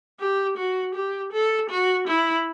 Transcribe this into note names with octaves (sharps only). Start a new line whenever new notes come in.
G4
F#4
G4
A4
F#4
E4